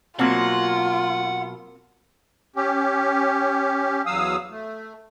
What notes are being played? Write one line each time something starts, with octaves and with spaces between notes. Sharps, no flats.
B2 F#3 A#3 C4 F4 F#5
C#4 G4
E2 F#3 F5 D#6 E6
A3